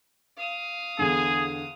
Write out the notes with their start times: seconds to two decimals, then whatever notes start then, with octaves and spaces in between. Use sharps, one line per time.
0.37 F5 D#6
0.99 E2 D3 G#4